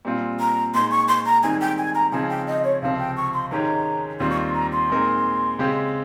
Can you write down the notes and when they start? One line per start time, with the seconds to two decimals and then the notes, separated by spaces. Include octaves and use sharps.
0.05 A#2 G3 C4 F4
0.40 A#5
0.74 A#2 G#3 D#4 C6
0.91 C#6
1.08 C6
1.26 A#5
1.43 G#2 D#3 G3 C4 G#5
1.61 G5
1.78 G#5
1.95 A#5
2.12 C#3 F3 G#3 C4 D#4 G#5
2.30 G5
2.47 D#5
2.64 C#5
2.82 C#2 C3 F3 C4 F5
2.99 G5
3.17 C#6
3.34 C6
3.51 G#2 D#3 G#3 C#4 G4 A#5
4.20 D#2 D#3 G3 C4 F4 C6
4.30 C#6
4.38 C6
4.54 A#5
4.72 C6
4.90 A#2 G#3 C4 D#4 A#4
5.59 C#3 G#3 C4 G4